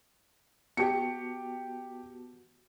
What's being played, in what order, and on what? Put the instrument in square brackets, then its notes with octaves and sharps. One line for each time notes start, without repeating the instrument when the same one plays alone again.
[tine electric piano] B3 F#4 A5 [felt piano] G4 C#7